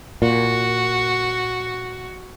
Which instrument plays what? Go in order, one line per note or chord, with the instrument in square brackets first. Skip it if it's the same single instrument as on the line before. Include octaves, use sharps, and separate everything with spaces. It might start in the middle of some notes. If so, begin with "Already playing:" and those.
[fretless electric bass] A#2 [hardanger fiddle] F#4